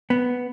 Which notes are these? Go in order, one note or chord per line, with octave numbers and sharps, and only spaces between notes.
B3